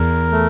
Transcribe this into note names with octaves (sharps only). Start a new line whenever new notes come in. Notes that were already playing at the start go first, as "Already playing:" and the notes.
Already playing: E2 A#4
A3